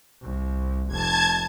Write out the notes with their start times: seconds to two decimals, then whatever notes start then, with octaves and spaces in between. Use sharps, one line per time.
0.21 C2
0.88 F1 A5 G#6